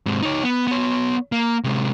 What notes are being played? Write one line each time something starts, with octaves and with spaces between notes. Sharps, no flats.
G#2 C3
D#4 C#5
B3
B3 C#5
A#3
C3 G#3